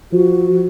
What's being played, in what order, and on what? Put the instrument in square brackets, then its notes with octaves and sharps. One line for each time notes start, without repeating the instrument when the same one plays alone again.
[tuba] F3 [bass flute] F#4